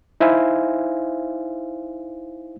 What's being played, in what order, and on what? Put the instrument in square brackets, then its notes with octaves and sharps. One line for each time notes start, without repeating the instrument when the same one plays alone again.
[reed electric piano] D#4 E4 C5 E5 F5 G#5